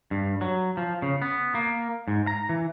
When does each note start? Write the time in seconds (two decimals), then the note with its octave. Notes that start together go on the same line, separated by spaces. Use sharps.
0.11 G2
0.41 F#3
0.77 F3
1.02 C#3
1.22 B3
1.55 A#3
2.08 G#2
2.27 A#5
2.49 E3